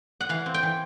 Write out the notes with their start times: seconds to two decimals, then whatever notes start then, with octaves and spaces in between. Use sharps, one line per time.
0.21 F#5
0.29 E3 F5
0.46 C4
0.54 G5
0.63 E3